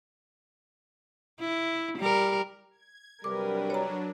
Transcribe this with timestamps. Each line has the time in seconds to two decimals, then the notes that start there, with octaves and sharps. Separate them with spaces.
1.40 E4
1.98 G3 A#4
2.71 G#6
3.24 C3 F#3 G3 D4 A#4 B4 D6
3.70 C#5 A#5